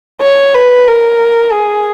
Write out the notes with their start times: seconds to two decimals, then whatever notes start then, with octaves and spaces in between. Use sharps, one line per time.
0.21 C#5
0.55 B4
0.87 A#4
1.52 G#4